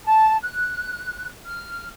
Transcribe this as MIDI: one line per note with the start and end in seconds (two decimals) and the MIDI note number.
0.05 0.36 81
0.42 1.27 90
1.45 1.89 89